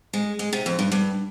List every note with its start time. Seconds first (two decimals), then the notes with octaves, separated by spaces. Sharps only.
0.13 G#3
0.39 G#3
0.53 C3
0.66 F2
0.79 G2
0.92 G2